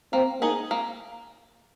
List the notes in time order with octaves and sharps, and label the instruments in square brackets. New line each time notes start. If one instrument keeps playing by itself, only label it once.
[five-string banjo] A#3 [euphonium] C4
[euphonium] A#3 [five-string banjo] D#4 G#4 D#5
[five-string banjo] A#3